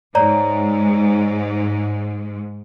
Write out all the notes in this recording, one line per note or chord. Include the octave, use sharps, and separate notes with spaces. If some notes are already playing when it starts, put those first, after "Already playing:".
G#2 C#5 D5 A#5